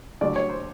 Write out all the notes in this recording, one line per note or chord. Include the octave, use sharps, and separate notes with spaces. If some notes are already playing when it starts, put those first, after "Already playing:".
D2 C#3 F#3 D5
C#5
C5